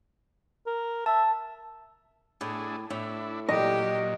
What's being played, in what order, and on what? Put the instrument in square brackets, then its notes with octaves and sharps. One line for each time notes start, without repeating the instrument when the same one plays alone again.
[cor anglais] A#4
[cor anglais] E5 [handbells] A5
[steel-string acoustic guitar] A2 [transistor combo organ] A3 D4 G#4
[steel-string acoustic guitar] A2 [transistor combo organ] D4 E4
[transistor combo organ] A#2 F#3 [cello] G4 [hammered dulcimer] D#5